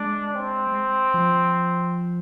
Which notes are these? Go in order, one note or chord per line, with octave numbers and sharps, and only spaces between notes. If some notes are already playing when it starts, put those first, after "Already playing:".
Already playing: G#3 D4
C4
F3